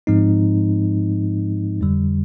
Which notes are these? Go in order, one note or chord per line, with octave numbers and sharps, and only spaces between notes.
G#2 F3 G#3 C4 D#4
F2 D3 G3